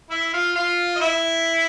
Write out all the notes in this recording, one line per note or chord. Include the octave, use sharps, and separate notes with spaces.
E4 E5
F4 F5
F4 F5
D#5
E4 E5